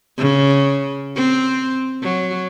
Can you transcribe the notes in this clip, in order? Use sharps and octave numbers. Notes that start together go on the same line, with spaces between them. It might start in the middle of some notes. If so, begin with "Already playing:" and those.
C#3
C4
F#3